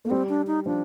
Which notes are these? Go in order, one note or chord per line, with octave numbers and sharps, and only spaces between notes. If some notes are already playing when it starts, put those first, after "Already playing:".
A3 A#3
G3 C4
D4
D#4
F3 D4